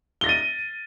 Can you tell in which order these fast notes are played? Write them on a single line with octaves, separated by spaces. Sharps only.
G7 A#6 A6 D#7